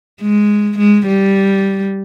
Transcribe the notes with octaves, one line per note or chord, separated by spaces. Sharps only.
G#3
G#3
G3